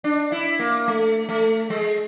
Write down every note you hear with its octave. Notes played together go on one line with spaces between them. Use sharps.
D4
E4
A#3
A3
A3
G#3